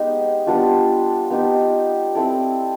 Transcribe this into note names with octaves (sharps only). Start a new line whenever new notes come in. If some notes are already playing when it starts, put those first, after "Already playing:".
Already playing: G#3 B3 D#4 G4
G3 B3 D4 F4
B3 D#4 G4
C4 E4 A4 D5